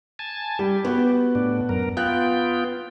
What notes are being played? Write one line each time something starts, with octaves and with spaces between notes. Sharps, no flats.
G#5 A5
G3 G4
B3 F#4
A2 D4
F#2 A#4
B3 F4 G5 F#6